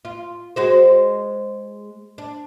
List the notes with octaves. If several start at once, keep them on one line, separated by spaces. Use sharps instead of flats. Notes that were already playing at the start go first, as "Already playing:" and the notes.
F4
G#3 F#4 C5
D4